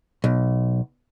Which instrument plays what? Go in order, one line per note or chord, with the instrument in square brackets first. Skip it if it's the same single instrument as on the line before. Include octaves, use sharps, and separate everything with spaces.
[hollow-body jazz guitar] B1